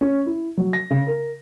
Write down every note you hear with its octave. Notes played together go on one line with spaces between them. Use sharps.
C#4
E4
F#3
A#6
C#3
A#4